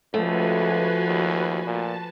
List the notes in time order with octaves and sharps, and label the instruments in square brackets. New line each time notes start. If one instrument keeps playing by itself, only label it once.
[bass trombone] C#2 [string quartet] F3 [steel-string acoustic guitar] A3 [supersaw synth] F#4 B4 G#5
[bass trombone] D#2
[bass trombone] A#2 [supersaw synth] A5